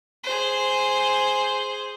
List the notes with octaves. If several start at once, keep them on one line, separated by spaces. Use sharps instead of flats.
G#4 C5